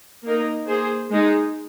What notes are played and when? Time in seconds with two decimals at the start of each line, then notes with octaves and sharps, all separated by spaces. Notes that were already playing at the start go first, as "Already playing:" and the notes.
0.24 A#3 D#4 A#4
0.68 A#3 G#4 C5
1.11 G#3 D#4 G#4